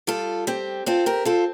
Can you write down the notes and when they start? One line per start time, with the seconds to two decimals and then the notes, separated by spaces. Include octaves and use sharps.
0.07 G3 F4 A4
0.47 C4 G4
0.86 C4 F4 A4
1.06 G4 A#4
1.25 C4 F4 A4